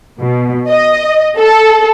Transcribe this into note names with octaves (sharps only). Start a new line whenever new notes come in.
B2
D#5
A4